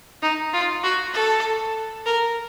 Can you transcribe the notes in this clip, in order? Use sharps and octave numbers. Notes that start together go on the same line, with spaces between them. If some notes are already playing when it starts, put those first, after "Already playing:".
D#4
F4
F#4
A4
A#4